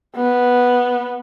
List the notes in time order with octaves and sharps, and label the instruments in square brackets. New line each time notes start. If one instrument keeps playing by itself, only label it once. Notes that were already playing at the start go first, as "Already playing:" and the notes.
[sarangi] B3